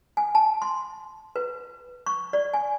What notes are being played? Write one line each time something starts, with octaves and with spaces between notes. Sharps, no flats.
G#5
A5
C6
B4
C#6
D5
G#5